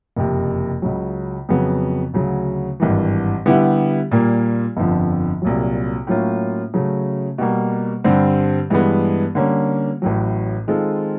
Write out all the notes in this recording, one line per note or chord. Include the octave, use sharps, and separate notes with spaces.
F#1 F2 C3
C#2 C#3 F#3
F2 C#3 F#3 B3
D2 C#3 F#3
G#1 G2 E3
D3 G3 B3 E4 G4
A#2 G3 A#3
G1 F2 D3 F3
C2 A#2 F#3
A2 F#3 A#3 C#4 F4
C#3 F#3 A3 C#4
B2 G3 A#3
G2 D3 G3 C4
G2 E3 G#3 B3
D3 G3 A#3 C#4
A1 A2 F#3
D#3 G#3 C4 F4 A4